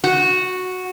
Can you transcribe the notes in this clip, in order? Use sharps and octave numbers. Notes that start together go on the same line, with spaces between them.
F#4